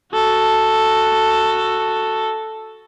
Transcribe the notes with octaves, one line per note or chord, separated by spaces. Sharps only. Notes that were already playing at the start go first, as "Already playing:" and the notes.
F#4 A4